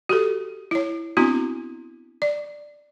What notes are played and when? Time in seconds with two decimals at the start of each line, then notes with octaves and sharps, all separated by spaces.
0.09 F#4 G4 A4
0.71 E4 C#5
1.17 B3 C4 D4 E4 F#4
2.22 D5